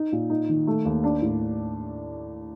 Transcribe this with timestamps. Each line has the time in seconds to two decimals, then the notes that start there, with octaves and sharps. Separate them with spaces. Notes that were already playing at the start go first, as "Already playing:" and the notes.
Already playing: D#4
0.12 A#2
0.30 D#4
0.49 D#3
0.67 A3
0.85 D#2
1.04 D4
1.22 A2